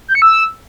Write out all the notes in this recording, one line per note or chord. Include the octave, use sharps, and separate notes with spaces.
G6
C#7
E6